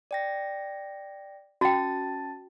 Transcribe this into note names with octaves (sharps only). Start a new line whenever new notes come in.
D5 G5 A#6
C#4 F#4 G5 A5 A6